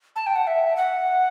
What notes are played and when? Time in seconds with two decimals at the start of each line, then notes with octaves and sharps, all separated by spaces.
0.16 A5
0.27 G5
0.36 F#5
0.47 E5
0.76 F#5